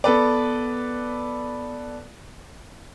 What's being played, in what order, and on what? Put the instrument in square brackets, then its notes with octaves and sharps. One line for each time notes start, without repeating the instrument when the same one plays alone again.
[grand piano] B3 A4 B4 D5